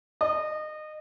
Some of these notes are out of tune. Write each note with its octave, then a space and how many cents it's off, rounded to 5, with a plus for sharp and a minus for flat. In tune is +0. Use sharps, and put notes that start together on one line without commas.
D#5 -25